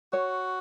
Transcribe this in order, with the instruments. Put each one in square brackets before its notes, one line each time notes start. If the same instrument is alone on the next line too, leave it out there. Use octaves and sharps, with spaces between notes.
[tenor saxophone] F#4 [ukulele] C#5